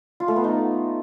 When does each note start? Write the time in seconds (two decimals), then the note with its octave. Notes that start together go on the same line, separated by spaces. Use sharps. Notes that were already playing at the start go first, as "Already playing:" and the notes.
0.20 F4
0.28 A3
0.36 B3
0.44 D#4